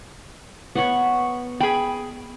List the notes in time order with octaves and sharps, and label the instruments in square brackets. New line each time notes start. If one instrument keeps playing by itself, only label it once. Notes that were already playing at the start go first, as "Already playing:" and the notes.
[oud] B3 C#5 [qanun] F#5 B5 C#6
[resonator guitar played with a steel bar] G#4 G5 [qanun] B5